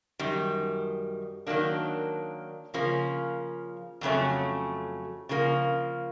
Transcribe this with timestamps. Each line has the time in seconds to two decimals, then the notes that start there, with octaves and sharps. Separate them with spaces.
0.19 F#2 D#3 G3
1.47 D#3 F#3 A#3 D4
2.74 C#3 F3 A#3 C#4
4.01 F2 C#3 F#3 A3 C#4
5.29 C#3 F3 A#3